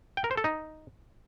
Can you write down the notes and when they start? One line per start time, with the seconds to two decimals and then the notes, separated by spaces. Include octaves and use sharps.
0.17 G5
0.24 A#4
0.31 C5
0.37 A4
0.44 D#4